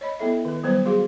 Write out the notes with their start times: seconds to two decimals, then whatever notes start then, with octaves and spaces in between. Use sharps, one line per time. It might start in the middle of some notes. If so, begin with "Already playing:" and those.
0.01 C#5 D#5 B5
0.19 B3 E4 A4 E5
0.45 D#3 B4
0.63 F#3 G3 B3 B4 C5
0.86 F#4 G#4 F5 C6